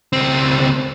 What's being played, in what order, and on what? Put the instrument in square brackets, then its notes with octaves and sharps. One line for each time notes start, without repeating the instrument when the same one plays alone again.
[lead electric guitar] C#2 C4